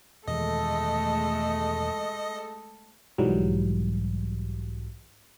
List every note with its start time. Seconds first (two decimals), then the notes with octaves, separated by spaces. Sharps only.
0.28 E2 B2 D#3 G#3 A3 A4 D#5
3.18 B1 G#2 E3 F#3 G3